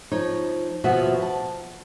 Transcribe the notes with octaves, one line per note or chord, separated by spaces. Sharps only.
F3 D#4 C#5
D#2 B2 F3 F#4 E5
A5